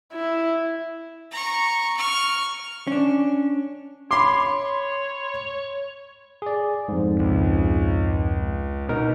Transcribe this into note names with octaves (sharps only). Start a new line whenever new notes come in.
E4
A#5 C#6
C#6 F6
C#4 D4
C#5 B5 C6 D6
G#4 D5
F2 G#2
C#2
B2 D#4 A#4